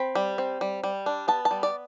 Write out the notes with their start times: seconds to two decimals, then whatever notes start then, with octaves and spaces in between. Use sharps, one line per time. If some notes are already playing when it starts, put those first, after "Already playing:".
Already playing: C4 B5
0.15 G3
0.38 C4
0.61 G3
0.84 G3
1.06 D4
1.28 B3 A5
1.45 A5
1.51 G3
1.63 D5